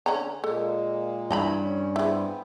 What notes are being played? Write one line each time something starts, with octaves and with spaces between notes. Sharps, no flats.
D3 C#4 A#5
A#2 G#3 A#3 A4
G2 E3 E4 D#5 A#5 B5
C#4
B3 C4 E4 G#4